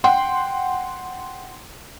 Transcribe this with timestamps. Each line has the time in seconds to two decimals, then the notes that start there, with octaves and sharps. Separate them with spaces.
0.04 F#5 G5 C6